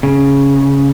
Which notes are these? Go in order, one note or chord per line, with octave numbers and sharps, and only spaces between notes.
C#3